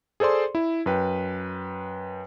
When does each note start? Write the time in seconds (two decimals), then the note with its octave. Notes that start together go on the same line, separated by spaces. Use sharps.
0.20 G#4 A4 C5 D5 C6
0.55 E4
0.86 F#2 B4 G5